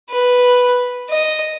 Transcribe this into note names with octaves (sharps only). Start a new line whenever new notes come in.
B4
D#5